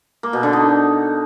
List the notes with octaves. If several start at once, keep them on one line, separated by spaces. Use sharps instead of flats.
A#3
B2
D3
D#4